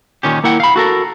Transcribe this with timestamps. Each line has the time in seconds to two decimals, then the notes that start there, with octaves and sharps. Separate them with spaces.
0.23 D#2 A#2 D#3 C#4 G4
0.44 A#3 E4 F#5 G5
0.60 F5 B5
0.76 F#4 A4 A#4